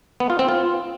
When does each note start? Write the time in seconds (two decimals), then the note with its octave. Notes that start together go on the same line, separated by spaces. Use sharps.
0.20 B3
0.30 F4
0.39 C4
0.48 F4